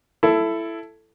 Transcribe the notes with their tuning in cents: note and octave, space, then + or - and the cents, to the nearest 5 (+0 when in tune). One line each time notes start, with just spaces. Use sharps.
E4 +15 A4 +0